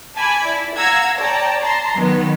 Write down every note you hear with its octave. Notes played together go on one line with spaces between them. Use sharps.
G#5 A5 B5 D6 G#6
E4 D5
F5 F#5 A#5 E6 G#6 A#6
C#5 D5 G5 A5 A#5
A5 A#5 C6
D#3 F#3 B3